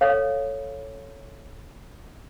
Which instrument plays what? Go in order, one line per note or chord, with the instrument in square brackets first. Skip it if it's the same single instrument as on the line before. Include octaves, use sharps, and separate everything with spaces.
[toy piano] A4 C#5 F5